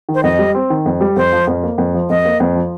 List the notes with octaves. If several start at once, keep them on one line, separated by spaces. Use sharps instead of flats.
D#3
C5
F2 D#5
G3
C4
D#3
F2
G3
F2 C5
F3
F2
A#3
F2
F3
F2 D#5
A#3
F2
F3